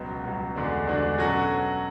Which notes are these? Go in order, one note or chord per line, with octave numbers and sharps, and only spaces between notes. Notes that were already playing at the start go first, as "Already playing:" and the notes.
Already playing: C#2 B2 F#3
C#2 B2 F#3
E2 D3 G#3 D4 F#4
E2 D3 G#3 D4 F#4
B2 F#3 C#4 F#4 A4